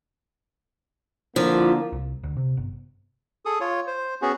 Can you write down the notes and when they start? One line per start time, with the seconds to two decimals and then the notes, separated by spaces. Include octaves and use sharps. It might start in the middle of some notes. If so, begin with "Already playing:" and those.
1.36 D3 F3 A#3 E4 F4
1.93 C2
2.23 D2
2.37 C3
2.57 G1
3.45 G#4 A4 D#6
3.60 F4 C#5
3.87 C5
4.22 B3 C#4 F#4 G#4